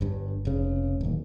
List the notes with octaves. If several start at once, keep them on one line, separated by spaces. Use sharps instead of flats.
G1 G2
F1 C#3
D1 D#2